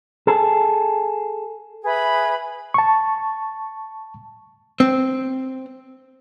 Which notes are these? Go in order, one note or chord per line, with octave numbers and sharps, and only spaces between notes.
G#4 A4
G#4 B4 E5 B5
A5 C#6
C4